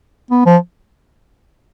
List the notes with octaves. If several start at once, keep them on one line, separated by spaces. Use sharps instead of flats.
B3
F3